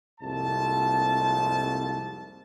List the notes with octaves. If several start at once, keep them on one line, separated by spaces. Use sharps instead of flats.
C2 F2 G#2 A#3 A5